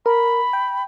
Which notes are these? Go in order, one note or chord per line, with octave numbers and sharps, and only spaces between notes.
A#4 B5
G5